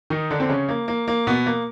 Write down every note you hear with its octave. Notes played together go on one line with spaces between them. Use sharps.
D#3 D#4
D3 D4
C4
C#3 C#4
A#3
A#3
A#3
B2 B3
A#3